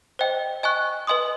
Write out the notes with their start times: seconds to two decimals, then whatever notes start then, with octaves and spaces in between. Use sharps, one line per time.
0.19 C5 D#5 G5
0.63 D#5 G#5 C#6 F#6
1.07 B4 D#5 G#5 C6 D#6